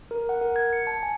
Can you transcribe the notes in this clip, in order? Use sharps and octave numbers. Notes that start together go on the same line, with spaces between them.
A#4
F#5
A#4
G#6
C#7
A5
G#5